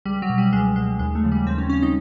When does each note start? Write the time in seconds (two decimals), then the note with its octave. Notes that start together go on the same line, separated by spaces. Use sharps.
0.06 C#2 G3
0.22 F#3
0.30 B2
0.38 G3
0.53 C#2 G#3
0.76 B2 G#3
0.99 D#2 G#3
1.15 A3
1.23 C#3 F3
1.32 G3
1.47 D#2 C4
1.58 C#4
1.70 C#3 F3 C#4
1.82 D#4